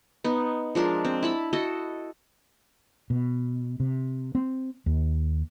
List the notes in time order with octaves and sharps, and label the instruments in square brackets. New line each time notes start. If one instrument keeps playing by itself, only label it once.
[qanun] B3 D#4
F3 G#3 D4 A#4
C4
E4 A5 B5
E4 F#4 A4 D#5
[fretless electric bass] B2
C3
C4
D#2